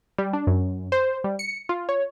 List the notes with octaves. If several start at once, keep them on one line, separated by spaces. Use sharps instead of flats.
G3
D4
F#2
C5
G3
C#7
F4
C#5